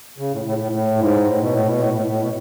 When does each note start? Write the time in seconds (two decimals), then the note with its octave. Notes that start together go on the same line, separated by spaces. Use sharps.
0.18 C#3
0.32 A2
0.45 A2
0.59 A2
0.72 A2
0.99 G#2
1.26 A2
1.40 B2
1.53 A2
1.67 B2
1.80 A2
1.88 B2
1.93 A2
2.06 A2
2.21 B2